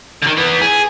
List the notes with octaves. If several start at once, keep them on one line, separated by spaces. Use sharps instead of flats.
D3 D#3
E3 B3
G#4